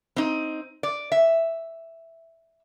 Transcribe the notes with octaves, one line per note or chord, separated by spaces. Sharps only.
C4 D#4
D5
E5